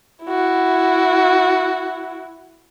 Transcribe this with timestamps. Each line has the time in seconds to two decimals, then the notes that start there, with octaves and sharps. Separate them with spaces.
0.24 E4 F#4